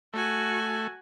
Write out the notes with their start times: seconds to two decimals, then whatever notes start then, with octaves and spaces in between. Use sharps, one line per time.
0.14 A3 F#4 G#5